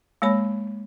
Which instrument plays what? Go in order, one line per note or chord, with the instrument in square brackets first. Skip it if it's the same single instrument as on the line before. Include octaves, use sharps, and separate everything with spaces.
[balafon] G#3 A#3 C#5 B5